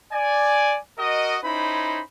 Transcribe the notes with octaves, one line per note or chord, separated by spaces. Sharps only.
D5 G#5
F#4 A#4 D#5
C#4 D#4 E4 C5 B5